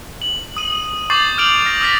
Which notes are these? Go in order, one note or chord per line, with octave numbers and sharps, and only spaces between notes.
F#7
D#6 D#7
C#6 D6 G6 A6 C7 F#7
F6 G6 D7 F7 F#7
F6 A#6
D#6 F6 A6 B6